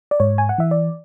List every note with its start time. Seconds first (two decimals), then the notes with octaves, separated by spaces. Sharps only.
0.11 D5
0.20 G#2 C#5
0.38 G#5
0.49 F#5
0.58 E3 E5
0.71 D5